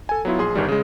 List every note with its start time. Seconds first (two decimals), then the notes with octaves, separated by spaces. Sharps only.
0.09 A4 G#5
0.25 F#3 B3 E4 F4
0.39 A#1 G#4 C6
0.55 G1 D#3 G3
0.68 C#3 G#3